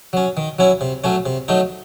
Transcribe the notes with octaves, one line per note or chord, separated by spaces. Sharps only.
F#3 C#4
D#3
F#3 C#4 E4
C3
F#3 A3 C#4
C3
F#3 A3 D#4